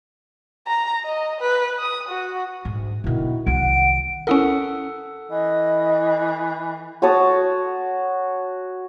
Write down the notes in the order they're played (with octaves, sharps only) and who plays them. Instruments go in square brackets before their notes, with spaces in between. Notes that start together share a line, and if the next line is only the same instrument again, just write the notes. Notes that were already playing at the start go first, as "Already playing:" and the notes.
[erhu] A#5
D#5
B4
D#6
F#4
[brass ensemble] D2 [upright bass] G#2
[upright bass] B2 D3 [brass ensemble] D#3 E4 F#4
[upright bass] C2 D#3 [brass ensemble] F#5 [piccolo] D7
[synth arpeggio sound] C#4 E4 A#4 [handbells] A4 F#5 D#6
[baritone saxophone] E3 [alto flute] D#5
[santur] F#4 C#5 A5 D#6